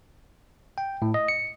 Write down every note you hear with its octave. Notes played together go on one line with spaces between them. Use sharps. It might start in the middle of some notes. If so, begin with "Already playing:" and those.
G5
A2
D#5
C#7